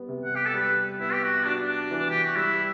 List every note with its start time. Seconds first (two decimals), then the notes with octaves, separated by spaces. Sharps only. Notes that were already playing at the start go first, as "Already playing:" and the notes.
Already playing: G3 B3
0.09 C3
0.25 F#5
0.35 G4
0.45 A4
0.54 G3 B4
0.99 B3 E4
1.13 G4
1.23 F#4
1.46 D4 F#4
1.60 D4
1.91 E3
2.10 G4
2.23 F#4
2.36 G3 E4